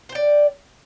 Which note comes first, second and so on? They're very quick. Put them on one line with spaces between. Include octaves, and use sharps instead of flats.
C5 G5 D5